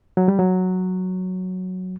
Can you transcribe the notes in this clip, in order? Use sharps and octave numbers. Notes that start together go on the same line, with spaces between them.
F#3
G3
F#3